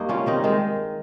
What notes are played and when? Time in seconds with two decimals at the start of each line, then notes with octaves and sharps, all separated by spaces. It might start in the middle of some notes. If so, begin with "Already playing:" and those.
Already playing: G2 A#3 D#4
0.09 G3 C#4 F4
0.26 D#3 C4 D#4
0.44 D#3 G#3 C4